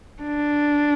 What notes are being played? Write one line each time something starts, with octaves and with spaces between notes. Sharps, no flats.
D4